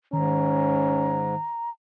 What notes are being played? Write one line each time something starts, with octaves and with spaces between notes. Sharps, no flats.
G#2 D#3 C#4 A#5